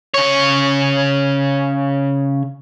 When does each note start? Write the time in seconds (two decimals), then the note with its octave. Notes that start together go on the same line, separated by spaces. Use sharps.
0.14 C#3 C#5